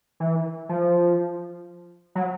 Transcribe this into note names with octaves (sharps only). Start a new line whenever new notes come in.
E3
F3
F#3